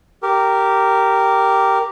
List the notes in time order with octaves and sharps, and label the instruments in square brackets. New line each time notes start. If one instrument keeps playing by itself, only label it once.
[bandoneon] G4 A#4